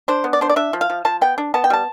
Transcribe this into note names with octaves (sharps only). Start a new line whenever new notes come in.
D4 C5
B3
D5
D4 C5
D5
D4 E5
F3
F5
F3
F3 A5
B3 G5
D4
B3 A5
G5
G3 A5